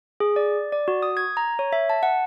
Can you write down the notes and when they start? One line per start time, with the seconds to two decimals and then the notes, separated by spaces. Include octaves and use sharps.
0.20 G#4
0.36 D5
0.72 D5
0.88 F#4
1.02 D#6
1.17 G#6
1.37 A#5
1.59 C#5
1.73 E5
1.90 A5
2.03 F#5